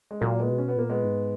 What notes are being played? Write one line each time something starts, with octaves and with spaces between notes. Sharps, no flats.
G#3
A#2 F#3 A#3
G#3 B3
B2
C#4
B3
A#2 A#3
G#3 B3
G#2